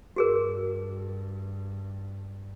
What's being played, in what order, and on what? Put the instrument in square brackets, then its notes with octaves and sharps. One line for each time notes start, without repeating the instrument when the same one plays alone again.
[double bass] G2 [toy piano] F#4 G#4 A#4